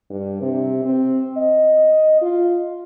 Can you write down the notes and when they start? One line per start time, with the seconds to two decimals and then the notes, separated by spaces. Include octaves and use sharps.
0.10 G2
0.41 C3
0.85 C4
1.37 D#5
2.22 F4